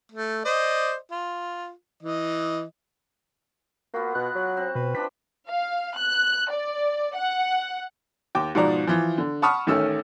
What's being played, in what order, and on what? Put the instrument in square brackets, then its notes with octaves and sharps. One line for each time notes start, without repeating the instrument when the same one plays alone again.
[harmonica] A3
C5 D5 D#5
F4
E3 D#5
[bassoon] A#3 [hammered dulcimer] B3 F4 F#4
[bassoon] B2 [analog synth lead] F#6
[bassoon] F#3
[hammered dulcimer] C4
[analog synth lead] B2 [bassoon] B4
[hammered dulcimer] F3 D4 C5 [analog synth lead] B6
[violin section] F5
F#6
D5
F#5
[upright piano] D#2 G5 D6
G#2 B2 F3 D5 A#5
E3 F3
D3
F#5 A5 B5 C#6 D#6 F6
A1 D#3 A3 C#4 E6